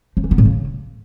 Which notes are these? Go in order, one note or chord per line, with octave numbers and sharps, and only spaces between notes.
F3
E3
B3
A2
C#3